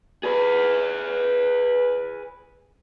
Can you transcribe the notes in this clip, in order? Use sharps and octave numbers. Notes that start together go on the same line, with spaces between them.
G#4 B4